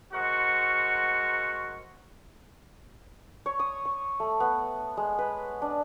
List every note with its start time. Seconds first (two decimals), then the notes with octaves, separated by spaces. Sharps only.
0.13 G#3 F#4 A#4 C5 F#5 C#6
3.46 C#5
3.59 D#6
3.85 C#6
4.20 A3
4.40 B3
4.97 G#3
5.19 B4
5.62 D4